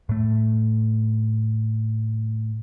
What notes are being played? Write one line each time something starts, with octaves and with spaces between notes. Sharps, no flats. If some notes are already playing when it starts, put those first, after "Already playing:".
A2 A3